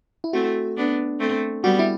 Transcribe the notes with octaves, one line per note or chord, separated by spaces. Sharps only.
E4
A3 C4 F#4
B3 D4
A3 C4
G3 B3 F#4
E4